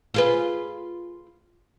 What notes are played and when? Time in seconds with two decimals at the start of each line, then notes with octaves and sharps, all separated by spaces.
0.14 F4 G#4 B4